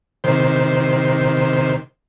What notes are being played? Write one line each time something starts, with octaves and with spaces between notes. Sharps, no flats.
C3 D#3 C5